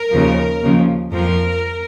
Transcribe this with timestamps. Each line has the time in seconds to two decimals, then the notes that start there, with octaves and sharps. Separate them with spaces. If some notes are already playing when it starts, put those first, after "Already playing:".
Already playing: A#4
0.11 D#2 C#3 F3
0.61 D#2 C#3 F3
1.12 F2 F3 A#4